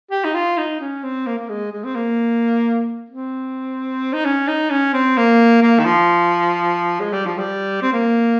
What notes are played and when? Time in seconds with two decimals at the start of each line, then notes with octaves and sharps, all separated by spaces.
0.11 G4
0.24 D#4
0.34 F4
0.58 D#4
0.80 C#4
1.03 C4
1.26 A#3
1.38 A#3
1.49 G#3
1.72 G#3
1.84 C4
1.95 A#3
3.10 C4
4.13 D#4
4.25 C#4
4.48 D#4
4.70 C#4
4.93 C4
5.17 A#3
5.62 A#3
5.79 D#3
5.85 F3
7.01 G#3
7.13 G3
7.26 F3
7.38 G3
7.82 C4
7.92 A#3